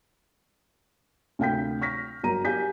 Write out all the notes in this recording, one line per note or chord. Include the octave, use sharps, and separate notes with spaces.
D2 C3 F5 G5 G6 B6
C#6 F6 A#6 B6
G1 F#3 A#4 A#5 D#7
G4 F5 G#5 G6 B6